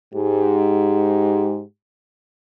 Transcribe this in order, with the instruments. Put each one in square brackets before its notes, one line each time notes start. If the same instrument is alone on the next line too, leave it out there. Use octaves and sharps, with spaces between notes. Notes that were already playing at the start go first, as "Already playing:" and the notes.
[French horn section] G#2 G4